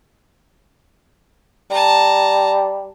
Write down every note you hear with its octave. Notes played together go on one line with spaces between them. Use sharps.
G3 A5 A#5